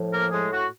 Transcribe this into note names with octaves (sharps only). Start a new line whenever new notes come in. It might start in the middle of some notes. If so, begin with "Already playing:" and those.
Already playing: A2 F3
A#3 A#4
A2 G#3 G#4
F#4